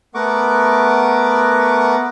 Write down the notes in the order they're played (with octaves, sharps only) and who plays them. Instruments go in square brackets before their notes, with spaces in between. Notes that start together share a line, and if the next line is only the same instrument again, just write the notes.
[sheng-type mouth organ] A3 B3 A#4 F#5 C#6 D6